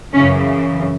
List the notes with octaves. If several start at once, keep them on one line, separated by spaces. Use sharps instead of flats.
F#2 C#3 E3 C#4